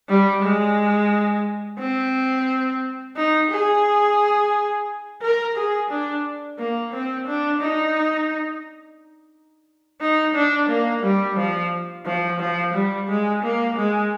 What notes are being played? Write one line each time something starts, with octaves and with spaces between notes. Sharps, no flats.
G3
G#3
C4
D#4
G#4
A#4
G#4
D4
A#3
C4
D4
D#4
D#4
D4
A#3
G3
F3
F3
F3
G3
G#3
A#3
G#3